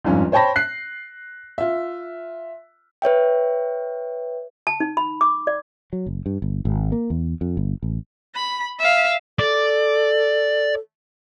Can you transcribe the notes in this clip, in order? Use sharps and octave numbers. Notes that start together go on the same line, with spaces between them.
G1 F2 G#2 C#4 F4
C5 C#5 G5 A5 B5 A#6
F#6 C7
F4 E5
B4 C#5 E5 G5
A5
D#4
B5
D6
D5
F#3
F#1
G2
G1
G#1
A#3
E2
F2
G1
A1
B5
E5 F5
A4 D5